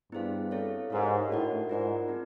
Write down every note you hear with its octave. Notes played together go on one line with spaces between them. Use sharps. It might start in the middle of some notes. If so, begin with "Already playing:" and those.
G2 B3 E4 G#4 C5 F5
C4 E4 A4 C#5 F5
G#2 G4 A#4 C#5 F5
A2 D4 F#4 A#4 D#5 F#5
G#2 F4 A#4 D5 F#5
C4 D#4